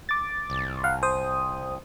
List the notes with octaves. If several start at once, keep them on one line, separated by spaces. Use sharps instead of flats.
D6 A6
C2
F5 F#5
C5 D#6